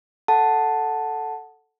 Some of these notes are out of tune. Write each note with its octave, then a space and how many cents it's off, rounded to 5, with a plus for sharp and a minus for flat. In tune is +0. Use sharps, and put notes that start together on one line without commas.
A4 +0 F#5 +0 A5 +0